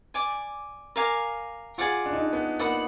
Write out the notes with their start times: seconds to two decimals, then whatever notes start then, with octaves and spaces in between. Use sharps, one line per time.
0.14 D5 G#5 D6
0.96 A#4 F5 G#5 D6
1.78 F4 G#4 D5 F#5 D6
2.06 D4
2.13 D#4
2.21 D4
2.33 B3
2.59 A#3 D5 F#5 B5 D#6